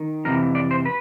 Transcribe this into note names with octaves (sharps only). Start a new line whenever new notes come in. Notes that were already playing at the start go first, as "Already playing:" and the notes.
Already playing: D#3
F2 C3 E3 A#4
D5
C5
B4